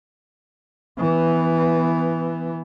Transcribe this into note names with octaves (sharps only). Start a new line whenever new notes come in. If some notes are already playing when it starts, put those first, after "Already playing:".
E3 B3